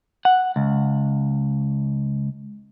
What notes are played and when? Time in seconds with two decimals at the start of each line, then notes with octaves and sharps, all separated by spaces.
0.25 F#5
0.56 C#2